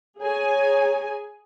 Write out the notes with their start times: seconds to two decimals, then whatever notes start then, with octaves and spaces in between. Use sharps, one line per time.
0.20 G#4 C#5 G#5 A#5